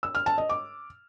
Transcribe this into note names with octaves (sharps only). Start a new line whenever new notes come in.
E6
F6
A5
D#5
D6